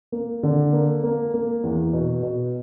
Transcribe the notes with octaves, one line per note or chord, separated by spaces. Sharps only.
A#3
D3
A#3
A#3
A#3
E2
B2
B2